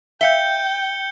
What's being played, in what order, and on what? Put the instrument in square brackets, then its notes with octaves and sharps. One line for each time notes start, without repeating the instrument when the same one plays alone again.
[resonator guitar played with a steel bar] E5 F5 [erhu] G5 [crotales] G6 C#7 G7